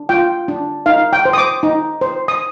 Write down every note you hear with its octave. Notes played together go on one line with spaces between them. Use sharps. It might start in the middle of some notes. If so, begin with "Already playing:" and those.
Already playing: D4
F4 G5
D4
D#4 F5
G5
C5
D#6
D6
D#4
C5
D#6